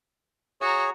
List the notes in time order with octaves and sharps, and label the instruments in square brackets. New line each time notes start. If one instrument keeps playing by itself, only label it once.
[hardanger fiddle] F#4 A#5 [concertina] G#4 C#5